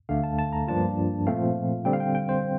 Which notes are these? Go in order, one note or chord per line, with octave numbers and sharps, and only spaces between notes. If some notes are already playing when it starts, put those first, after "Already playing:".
D2 D3 A3 F5
A5
A5
A#5
G2 F3 A#3 D4 F4 A5
A#2 F3 A3 C4 F5
D3 G3 C4 G5
F5
G5
G5
C5